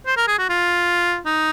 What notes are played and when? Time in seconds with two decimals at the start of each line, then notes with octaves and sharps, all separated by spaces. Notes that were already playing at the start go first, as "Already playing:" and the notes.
0.06 C5
0.17 A#4
0.27 G#4
0.38 F#4
0.49 F4
1.26 D#4